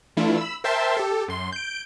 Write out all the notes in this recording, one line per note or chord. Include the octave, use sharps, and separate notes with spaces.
E3 A3 D4 E4 F4
B5 E6
A#4 C5 E5 G5 A5 C6
G4 A4
F#2 C6
G6 D7